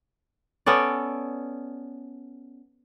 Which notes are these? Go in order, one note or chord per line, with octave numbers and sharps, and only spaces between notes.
B3 C#4 A4 D5